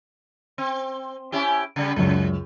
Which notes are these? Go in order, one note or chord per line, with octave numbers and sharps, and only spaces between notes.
C4
C#4 E4 G4
C#3 G3
C#2 F#2 C#3